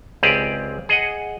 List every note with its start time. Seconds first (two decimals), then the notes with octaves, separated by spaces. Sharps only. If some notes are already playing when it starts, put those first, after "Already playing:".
0.23 C#2 C4 G4 G#4 D5
0.89 G#4 D#5 F#5